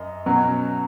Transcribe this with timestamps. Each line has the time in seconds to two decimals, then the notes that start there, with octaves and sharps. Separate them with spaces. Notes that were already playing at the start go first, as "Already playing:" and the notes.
Already playing: F#2 D#5
0.26 B2 F#3 C#4